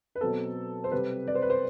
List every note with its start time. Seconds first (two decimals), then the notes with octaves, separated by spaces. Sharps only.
0.15 B4
0.21 B2 F#3 C4 A4
0.84 C5
0.91 C3 G3 C4 B4
1.28 D5
1.35 C5
1.42 B4
1.50 C5